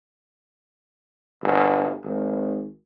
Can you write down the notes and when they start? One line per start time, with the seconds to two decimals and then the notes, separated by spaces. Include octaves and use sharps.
1.42 G1
2.04 G#1